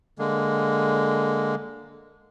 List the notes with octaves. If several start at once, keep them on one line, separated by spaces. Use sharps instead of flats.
D3 G#3 A#3